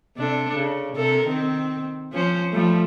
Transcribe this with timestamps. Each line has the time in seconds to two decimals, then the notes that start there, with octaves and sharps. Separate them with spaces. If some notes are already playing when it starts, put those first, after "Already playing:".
0.17 C3 D4 A4
0.55 C#3
0.95 C3 A4 A#4
1.27 D#3 C4
2.12 F3 C#4 C5
2.52 F3 G3 A3